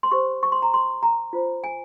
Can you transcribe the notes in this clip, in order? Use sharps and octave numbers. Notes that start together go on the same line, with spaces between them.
C6
G4 C5 C#6
C#6
C6
A#5
C6
A#5
F4 C5
G#5